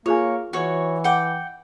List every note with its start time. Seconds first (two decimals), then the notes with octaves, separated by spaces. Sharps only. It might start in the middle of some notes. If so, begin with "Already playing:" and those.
0.06 A#3 F4 G#4 C#5 G#5
0.53 E3 F#4 C#5
1.04 F#5 G5 D6